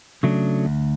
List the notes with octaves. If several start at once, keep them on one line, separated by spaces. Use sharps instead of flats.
C#3 F#3 A3 D4
D2